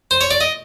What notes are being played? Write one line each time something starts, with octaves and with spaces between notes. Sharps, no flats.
C5
C#5
D5
D#5